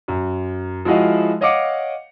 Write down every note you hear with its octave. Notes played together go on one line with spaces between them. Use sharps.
F#2
F3 G#3 E4 F#4 D#5 F5
C#5 D#5 F5 F#5 D6 C#7